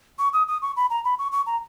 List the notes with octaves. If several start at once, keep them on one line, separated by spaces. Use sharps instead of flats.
C#6
D#6
D#6
C#6
B5
A#5
B5
C#6
C#6
A#5